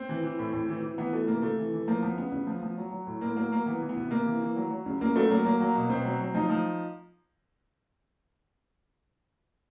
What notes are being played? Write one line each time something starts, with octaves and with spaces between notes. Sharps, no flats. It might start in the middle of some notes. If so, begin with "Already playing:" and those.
Already playing: C4
E3
E3
A2
A2
E3
E3
E3 B3
E3 A3
C3 A#3
C3 A3
E3
E3
F3 A#3
F3 B3
C#3 B3
C#3
F3
F3
F#3
F#3
A2
A2 A#3
F#3 A#3
F#3 A#3
E3 B3
E3
B3
C3
C3 A#3
E3
E3
F#3
F#3
C#3
C#3 A#3
F#3 A3
F#3 A#3
F#3 A#3
F#3
B2
B2 C4
F#3
F#3
F3 D#4
F3